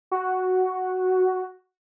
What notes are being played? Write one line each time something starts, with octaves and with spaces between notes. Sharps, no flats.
F#4